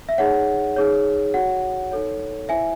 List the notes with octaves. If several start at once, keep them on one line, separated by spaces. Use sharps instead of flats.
E5
D#4 G#4 C#5 F#5
D#4 G#4 C#5
F#4 C#5 F#5
D#4 A4 C#5
E4 C5 E5 G#5